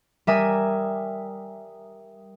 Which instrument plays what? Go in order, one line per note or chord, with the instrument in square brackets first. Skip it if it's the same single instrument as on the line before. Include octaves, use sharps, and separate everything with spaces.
[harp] G3 A#4 E5 G#5 D#6